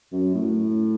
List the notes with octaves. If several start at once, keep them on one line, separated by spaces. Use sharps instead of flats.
F#2
A2